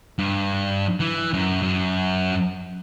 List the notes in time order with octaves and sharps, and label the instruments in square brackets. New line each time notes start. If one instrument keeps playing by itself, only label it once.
[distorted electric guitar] G2
E3
F#2
F#2